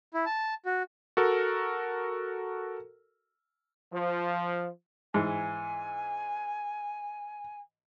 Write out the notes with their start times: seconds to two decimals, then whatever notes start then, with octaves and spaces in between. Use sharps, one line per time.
0.14 E4
0.26 A5
0.66 F#4
1.17 F#4 A4 A#4
3.93 F3
5.14 G#2 E3 G#5